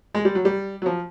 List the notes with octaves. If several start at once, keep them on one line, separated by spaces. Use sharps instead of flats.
G#3
G3
F#3
G3
F#3
F3